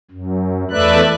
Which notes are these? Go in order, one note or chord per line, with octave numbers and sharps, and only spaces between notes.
F#2
E2 A3 B4 D5 E5 F#6